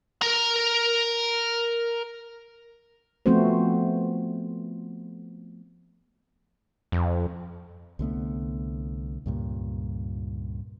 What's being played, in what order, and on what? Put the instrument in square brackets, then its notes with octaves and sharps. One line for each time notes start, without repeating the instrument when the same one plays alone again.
[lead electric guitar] A#4 A#5
[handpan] F3 A3 B3 C4 F#4 C5
[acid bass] F2
[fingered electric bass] C2 D3 A3 B3
C#2 G2 A#2